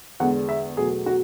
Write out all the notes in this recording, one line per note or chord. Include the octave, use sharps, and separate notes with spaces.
E2 D3 G#3 F#5
E5
E2 B2 F#3 A3 G#4
F#4